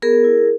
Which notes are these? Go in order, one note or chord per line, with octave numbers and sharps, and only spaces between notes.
B3 G#4 A#4
E4